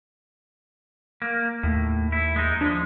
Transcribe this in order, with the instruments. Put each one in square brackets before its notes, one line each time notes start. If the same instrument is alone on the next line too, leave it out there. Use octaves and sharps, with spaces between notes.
[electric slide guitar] A#3
[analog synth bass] D#2 [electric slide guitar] A2
[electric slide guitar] E4
G#3 D#4
[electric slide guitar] F3 G#3 [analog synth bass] D4